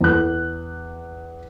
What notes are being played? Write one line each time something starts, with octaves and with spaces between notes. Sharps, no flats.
E2 F#6